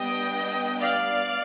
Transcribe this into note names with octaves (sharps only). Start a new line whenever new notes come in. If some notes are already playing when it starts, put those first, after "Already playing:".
Already playing: G3 B3 D4 D#5 G5
D5 F5